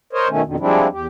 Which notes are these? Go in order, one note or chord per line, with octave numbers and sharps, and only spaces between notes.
A#4 C5 C#5 D#5
B2 D#3 A3 C#4
F2 B2 D3 D#3
F3 G3 G#3 C4 D4 E4
E2 G4